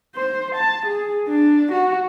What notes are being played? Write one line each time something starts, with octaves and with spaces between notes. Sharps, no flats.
C5
A5
G#4
D4
F#4